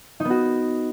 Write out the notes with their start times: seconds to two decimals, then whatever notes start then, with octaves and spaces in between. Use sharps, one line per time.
0.20 D#4
0.25 B3
0.30 F#4